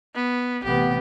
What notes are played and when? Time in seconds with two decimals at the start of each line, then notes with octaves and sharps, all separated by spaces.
0.15 B3
0.64 A1 C3 B3 G4